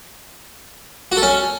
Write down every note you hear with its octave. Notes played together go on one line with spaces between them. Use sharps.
F#4
A4
C#4